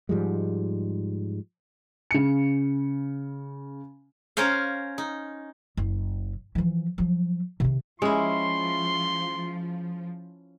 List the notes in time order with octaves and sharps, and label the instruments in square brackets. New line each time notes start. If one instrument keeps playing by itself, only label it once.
[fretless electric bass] G#2 F3 G3 G#3
[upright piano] C#3 C#7
[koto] C#4 A#4 C5 C#5 F5
D#4
[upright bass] F#1
E3 F3
F3 F#3
C3 D#3
[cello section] F3 [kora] G#3 [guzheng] C#4 E4 [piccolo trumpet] C6